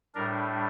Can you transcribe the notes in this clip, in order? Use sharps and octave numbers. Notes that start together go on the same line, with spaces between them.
A2 G3 D4 A#4